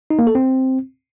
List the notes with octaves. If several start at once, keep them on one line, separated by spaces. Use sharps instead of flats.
D#4
A#3
A4
C4